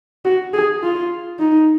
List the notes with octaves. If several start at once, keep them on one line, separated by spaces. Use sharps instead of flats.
F#4
G#4
F4
D#4